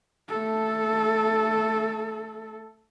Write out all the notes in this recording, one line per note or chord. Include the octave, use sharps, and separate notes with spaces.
A3 A4